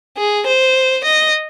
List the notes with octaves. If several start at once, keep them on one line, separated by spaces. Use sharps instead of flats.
G#4
C5
D#5